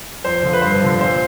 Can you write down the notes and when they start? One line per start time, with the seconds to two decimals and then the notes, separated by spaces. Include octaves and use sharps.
0.25 F2 C5
0.43 D3 F3
0.53 B4
0.62 G2 C5
0.81 D3 F3
1.00 A#2 C5